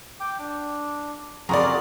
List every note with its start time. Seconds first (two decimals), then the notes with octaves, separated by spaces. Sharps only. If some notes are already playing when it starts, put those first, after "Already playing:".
0.20 G5 D6
0.39 D4
1.49 F2 C#3 F4 F#4 G#4 A#4 D5 A#5